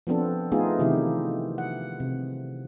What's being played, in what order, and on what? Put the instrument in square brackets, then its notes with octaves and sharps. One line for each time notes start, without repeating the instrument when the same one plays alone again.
[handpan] F3 B3 C4 D4 A4
A3 B3 D#4 F4 G#4
C3 D#3 E3 E4 G4
F#5
C3